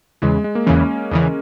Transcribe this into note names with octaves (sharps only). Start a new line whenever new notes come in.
E2 C#3 E3 G#3
G#3
A#3
E2 C#3 E3 C#4
E2 C#3 E3